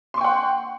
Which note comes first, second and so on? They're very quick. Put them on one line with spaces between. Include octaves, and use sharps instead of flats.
C6 C#6 G5 F#5